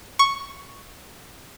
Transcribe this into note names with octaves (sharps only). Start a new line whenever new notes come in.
C#6